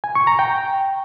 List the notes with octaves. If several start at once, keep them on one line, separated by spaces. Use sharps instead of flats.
G#5
C#6
A#5
G5